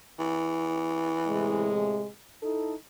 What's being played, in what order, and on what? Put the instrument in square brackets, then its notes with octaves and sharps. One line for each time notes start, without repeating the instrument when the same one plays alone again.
[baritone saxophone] E3
[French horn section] A2 C3 G#3
D#4 E4 A4